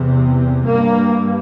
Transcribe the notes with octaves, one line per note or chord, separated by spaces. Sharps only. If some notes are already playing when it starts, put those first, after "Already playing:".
Already playing: E2 C3
G2 A#3